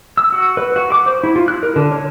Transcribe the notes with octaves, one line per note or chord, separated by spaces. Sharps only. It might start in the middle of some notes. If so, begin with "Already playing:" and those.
E6
F#4
B4
F#4
D6
C5
E4
F4
F#6
A#4
D3
C#5